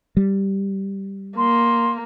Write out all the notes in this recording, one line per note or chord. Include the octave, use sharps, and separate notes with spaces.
G3
A#3 C6